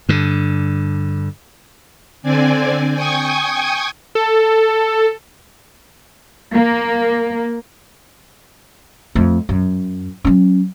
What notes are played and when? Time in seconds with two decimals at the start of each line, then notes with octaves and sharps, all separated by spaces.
0.09 G2 D3
2.22 D3 C4 D5 G#5
2.93 G5 G#5 C#6 D#6 G#6
4.15 A4
6.53 A#3
9.15 F2 A3
9.49 F#2
10.24 F#3 C#4